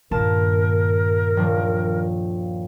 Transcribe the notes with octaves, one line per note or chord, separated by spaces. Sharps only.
G2 A#2 D#3 A#4 A5 E7
D#1 F3 D4